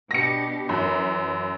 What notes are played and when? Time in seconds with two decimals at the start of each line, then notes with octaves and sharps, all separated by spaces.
0.11 B2 D4 G4 A#6 C#7
0.69 F#2 E3